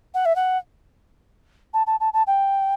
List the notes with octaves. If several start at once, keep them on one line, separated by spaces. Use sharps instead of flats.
F#5
E5
F#5
A5
A5
A5
A5
G5